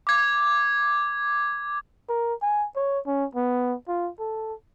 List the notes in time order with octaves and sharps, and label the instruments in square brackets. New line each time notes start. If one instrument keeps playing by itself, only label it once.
[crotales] D6 G#6
[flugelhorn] A#4
G#5
C#5
C#4
B3
F4
A4